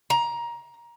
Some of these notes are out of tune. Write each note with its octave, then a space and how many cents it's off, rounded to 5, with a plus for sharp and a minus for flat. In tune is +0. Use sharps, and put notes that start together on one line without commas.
A#5 +20